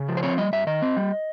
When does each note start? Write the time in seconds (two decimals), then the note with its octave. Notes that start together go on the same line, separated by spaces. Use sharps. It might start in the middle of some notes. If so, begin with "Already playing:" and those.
Already playing: C#3
0.08 F3
0.17 C5
0.23 C4 C#5
0.38 G3 D#5
0.53 G2 E5
0.67 D#3 D#5
0.82 C4
0.97 G3